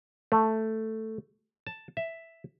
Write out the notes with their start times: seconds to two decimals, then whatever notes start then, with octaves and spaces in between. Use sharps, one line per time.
0.32 A3
1.67 A5
1.97 E5